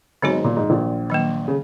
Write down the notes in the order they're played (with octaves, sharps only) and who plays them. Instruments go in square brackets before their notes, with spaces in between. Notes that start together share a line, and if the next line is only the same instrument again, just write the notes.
[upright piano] G#1 G#2 [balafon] D#3 F#3 B3 F#4 C#5
[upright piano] A#2
G#2
A#1 A#2
[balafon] D#3 F#3 A#3
[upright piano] C#3